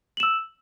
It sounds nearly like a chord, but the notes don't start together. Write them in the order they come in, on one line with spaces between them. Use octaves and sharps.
F#7 E7 E6